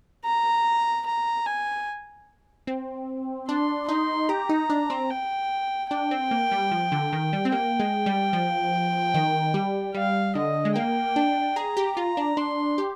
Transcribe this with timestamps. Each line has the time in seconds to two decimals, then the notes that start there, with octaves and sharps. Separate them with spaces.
0.25 A#5
1.06 A#5
1.46 G#5
2.67 C4
3.48 D4 C6
3.88 D#4 C6
4.29 G4 A#5
4.49 D#4
4.70 D4
4.90 C4
5.10 G5
5.91 D4 G5
6.11 C4
6.31 A#3
6.51 G3
6.71 F3
6.92 D3
7.13 D#3
7.33 G3
7.45 C4
7.52 A#3 G5
7.80 G#3
8.06 G3
8.33 F3
9.14 D#3
9.54 G3
9.94 G3 F5
10.35 D3 D#5
10.65 G#3
10.76 A#3 G5
11.16 D4
11.56 G#4 A#5
11.77 G4
11.96 F4 A#5
12.17 D4
12.37 D4 C6
12.78 G4